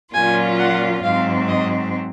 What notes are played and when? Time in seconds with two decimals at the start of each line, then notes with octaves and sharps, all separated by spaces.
0.14 A#2 F#3 C#4 F4 G#5
0.59 F#5
1.04 G#2 F#3 C4 F5
1.49 D#5